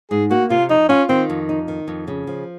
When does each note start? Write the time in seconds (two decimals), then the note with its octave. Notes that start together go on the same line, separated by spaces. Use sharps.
0.11 G#2 G#4
0.31 A#3 F#4
0.50 C3 F4
0.69 F2 D#4
0.89 C#4 F4
1.09 D#3 C4
1.30 F2
1.49 D#4
1.68 D#3
1.88 F2
2.08 C#3
2.27 F3